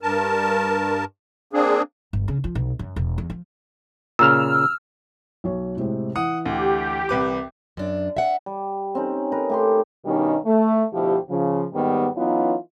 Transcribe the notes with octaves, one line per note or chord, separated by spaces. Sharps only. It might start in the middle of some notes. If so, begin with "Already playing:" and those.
G2 A#4 A5
A#3 C4 D4 G#4
G1
C#3
F3
B1
F#2
E1
E2
F3
A#2 C#3 E6 F6
B1 C#5
A2 C3 G#3
E3 F#5 D#6
D2 G4
C2 B4 D6
F#2 D4
E5 F#5
G3
C4 C#4 D#4
D#4 A#4 B4
A3 G4 C6
G2 B2 D#3 G3 C#4 D#4
A3
D2 B2 F3 E4 G4
C#3 F3
D#2 G#2 D#3 G3 B3
E3 F#3 B3 C#4 D#4 F4